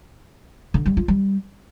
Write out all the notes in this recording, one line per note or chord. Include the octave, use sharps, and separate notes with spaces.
D3
G3
F4
G3